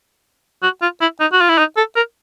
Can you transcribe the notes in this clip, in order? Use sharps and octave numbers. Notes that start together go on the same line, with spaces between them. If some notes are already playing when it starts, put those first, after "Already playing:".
F#4
F4
E4
D#4
F#4
F4
E4
D#4
A4
A#4